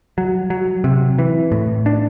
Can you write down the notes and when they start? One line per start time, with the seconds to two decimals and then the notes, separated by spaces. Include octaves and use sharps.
0.18 F#3
0.50 F#3
0.84 C3
1.19 E3
1.52 A2
1.86 D4